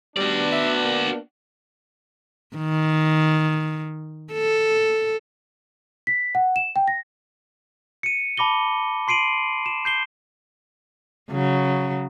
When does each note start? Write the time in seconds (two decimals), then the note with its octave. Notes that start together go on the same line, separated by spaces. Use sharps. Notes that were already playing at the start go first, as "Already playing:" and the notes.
0.17 G3 B3 D4 F#4 D5
0.52 E5
0.84 A#3
2.56 D#3
4.34 A4
6.07 B6
6.35 F#5
6.56 E7
6.76 G5
6.88 A#6
8.03 C#7 D#7
8.37 A5 B5 D6 A#6 G7
9.08 C6 C7 D7 D#7 F#7
9.66 E7
9.85 G6 C7 G7
11.31 C#3 F#3